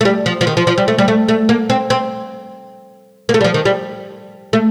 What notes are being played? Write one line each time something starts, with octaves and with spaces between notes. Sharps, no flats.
A3
G3
F3
F3
D#3
F3
F3
G3
A3
G3
A3
A3
A#3
C4
C4
A#3
A3
G3
F3
D#3
G3
A3